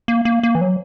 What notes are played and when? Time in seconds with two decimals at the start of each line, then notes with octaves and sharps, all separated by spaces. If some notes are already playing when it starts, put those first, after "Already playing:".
0.08 A#3
0.25 A#3
0.43 A#3
0.55 E3
0.61 F#3